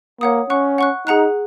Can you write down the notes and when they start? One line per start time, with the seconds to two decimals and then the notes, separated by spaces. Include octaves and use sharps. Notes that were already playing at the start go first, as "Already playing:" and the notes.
0.21 A#3 C#5 F#5 D#6
0.50 C#4 F#5 C#6 F#6
0.78 F#5 C#6 F#6
1.07 D#4 G#4 F#5 A#5 F#6